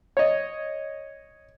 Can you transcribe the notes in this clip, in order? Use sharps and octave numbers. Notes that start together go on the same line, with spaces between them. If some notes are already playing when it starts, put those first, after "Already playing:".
C#5 D#5